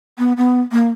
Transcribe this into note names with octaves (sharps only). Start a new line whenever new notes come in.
B3
B3
A#3